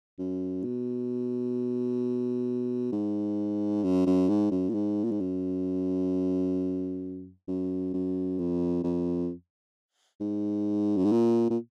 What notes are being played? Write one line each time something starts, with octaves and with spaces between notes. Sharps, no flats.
F#2
B2
G#2
F#2
F#2
G#2
F#2
A#2
G#2
A#2
G#2
F#2
F#2
F#2
F2
F2
G#2
F#2
G#2
A#2
A#2